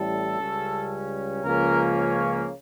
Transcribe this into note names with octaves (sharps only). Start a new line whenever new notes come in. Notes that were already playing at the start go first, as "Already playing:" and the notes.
Already playing: A1 A2 G3 A4
C#2 C#3 G3 C#4
C#2 C#3 F3 A#3 C#4 A#4
C#5